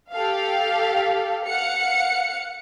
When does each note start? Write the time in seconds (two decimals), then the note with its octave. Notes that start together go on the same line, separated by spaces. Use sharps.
0.13 G4 A4 F5
1.46 F5 F#5 C#7